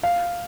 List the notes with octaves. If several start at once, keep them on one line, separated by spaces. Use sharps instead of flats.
F5